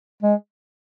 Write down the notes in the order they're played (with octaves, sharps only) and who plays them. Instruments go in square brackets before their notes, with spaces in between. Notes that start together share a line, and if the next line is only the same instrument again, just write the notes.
[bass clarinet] G#3